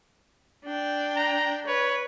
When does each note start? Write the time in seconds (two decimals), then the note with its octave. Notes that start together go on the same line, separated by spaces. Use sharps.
0.66 D4 G5
1.16 A#5
1.67 B4 C#5